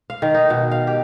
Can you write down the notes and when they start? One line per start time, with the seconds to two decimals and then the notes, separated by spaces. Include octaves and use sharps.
0.10 F5
0.22 D#3
0.34 D#4
0.50 B2
0.71 F5
0.87 G4